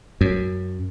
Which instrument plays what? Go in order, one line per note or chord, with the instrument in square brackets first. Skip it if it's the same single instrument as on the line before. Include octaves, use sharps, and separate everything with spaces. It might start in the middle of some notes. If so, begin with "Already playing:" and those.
[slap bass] F#2